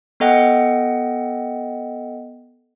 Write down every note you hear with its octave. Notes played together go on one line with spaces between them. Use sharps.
B3 A4 D#5 F#5 G5